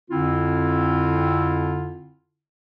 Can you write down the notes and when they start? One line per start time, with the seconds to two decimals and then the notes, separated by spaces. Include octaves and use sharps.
0.11 F2 D3 C4 E4 F4